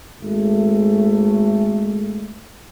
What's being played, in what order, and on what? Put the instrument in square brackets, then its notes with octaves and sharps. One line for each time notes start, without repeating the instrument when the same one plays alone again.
[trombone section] G#1 G#3 A3